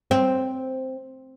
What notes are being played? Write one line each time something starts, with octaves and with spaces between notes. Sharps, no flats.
C4